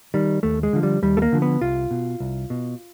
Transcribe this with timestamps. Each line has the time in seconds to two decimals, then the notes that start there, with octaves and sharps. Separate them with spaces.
0.14 D#3 G3
0.43 D#2 A3
0.63 G#3
0.73 D3 F3
0.83 G3
1.02 D#2 G3
1.17 A3
1.22 A#3
1.32 D3 F3
1.42 B3
1.61 C2 F4
1.91 B2
2.20 C2
2.50 B2